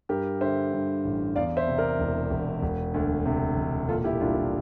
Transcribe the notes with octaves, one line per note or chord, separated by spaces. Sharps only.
G2 G4 A#4
D3 C5 E5
G2
A1
E2 D5 F5
C5 E5
C3
A#4 D5
E1
E1
E1
D2
C3
E1
A#2 F4 A4
E4 G4
C2 D4 F4
E4